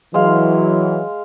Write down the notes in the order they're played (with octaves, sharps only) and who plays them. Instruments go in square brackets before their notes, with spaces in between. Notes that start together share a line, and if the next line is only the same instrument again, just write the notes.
[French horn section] E3 F#3 [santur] G#3 F5